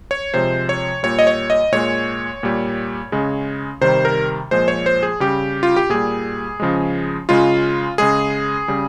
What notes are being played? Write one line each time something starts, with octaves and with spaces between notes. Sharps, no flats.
C#5
C3 F3 G#3 C5
C#5
A#2 G3 C#5
D#5
C#5
D#5
A#2 G#3 C#5
A#2 G3
C#3 G#3
C3 D#3 G3 C5
A#4
A#2 F3 G#3 C5
C#5
C5
G#4
C#3 G3 G4
F4
G4
A#2 G3 G#4
C#3 F3 G#3
C#3 G#3 F4
C#3 G#3 G#4
C#3 G3